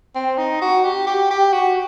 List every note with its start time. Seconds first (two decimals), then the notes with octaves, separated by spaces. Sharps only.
0.15 C4
0.38 D#4
0.61 F#4
0.84 G4
1.06 G4
1.31 G4
1.53 F#4